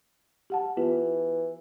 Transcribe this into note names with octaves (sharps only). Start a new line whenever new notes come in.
G4 F#5 A5
E3 B3 F4 G4